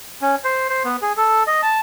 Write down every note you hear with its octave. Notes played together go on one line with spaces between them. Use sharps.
C#4
C5
C5
B3
G#4
A4
D#5
A5